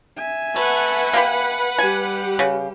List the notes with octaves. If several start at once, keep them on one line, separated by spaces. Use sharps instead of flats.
E5 G#5
A3 B4 F#5
A#3 G4 B5
G3 G4 G#5
C#3